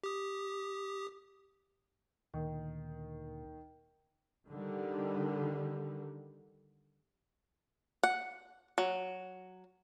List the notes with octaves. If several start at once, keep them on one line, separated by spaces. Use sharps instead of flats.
G4 D#6
D2 A#2 D#3
D3 D#3 G3
F#5
F#3